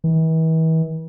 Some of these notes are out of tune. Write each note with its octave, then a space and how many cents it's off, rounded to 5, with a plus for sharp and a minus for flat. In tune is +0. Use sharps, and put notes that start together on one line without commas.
E3 -40